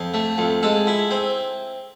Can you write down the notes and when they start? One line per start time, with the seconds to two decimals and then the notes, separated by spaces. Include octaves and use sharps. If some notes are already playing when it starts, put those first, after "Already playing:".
Already playing: F2
0.14 A3
0.38 F2
0.63 G#3 A4
0.87 E4
1.11 C4